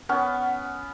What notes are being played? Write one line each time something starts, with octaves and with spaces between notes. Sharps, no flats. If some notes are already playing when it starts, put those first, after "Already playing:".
B3 C#4